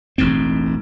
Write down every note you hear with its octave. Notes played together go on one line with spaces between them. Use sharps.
E1 A1 G#2 C4